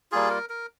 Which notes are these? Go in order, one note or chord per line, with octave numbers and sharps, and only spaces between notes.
G3 A#3 F4 G#4
A#4
A#4